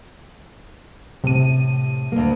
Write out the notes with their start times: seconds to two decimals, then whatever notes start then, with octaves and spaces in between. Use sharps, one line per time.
1.24 A2 C3 D#7
2.12 D2 A#3